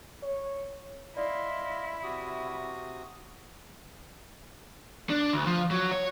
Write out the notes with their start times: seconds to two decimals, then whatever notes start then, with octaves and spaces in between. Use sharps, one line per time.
0.23 C#5
1.17 E4 D5 D#5 F5 C6
2.03 C3 F#4 D#6
5.10 D4
5.33 D2
5.46 F3
5.71 F#3
5.92 C#5